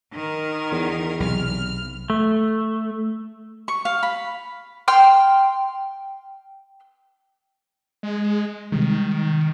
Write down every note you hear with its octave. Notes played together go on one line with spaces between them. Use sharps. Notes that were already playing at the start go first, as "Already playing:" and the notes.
D#3 A#4
E2
B1 C3 F6
A3
C#6
F5
B5
G5 C6 F6
G#3
C3 D#3 G3 G#3